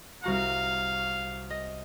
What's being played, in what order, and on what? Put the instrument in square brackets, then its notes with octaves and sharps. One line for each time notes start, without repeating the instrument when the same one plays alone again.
[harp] C2 F#4 A#5 [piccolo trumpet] F5
[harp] D#5